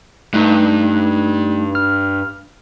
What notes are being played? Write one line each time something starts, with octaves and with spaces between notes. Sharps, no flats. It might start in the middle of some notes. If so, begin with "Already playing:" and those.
G2 A3 D#4
F6